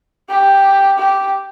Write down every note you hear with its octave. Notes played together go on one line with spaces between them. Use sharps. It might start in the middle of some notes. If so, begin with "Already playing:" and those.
G4
G4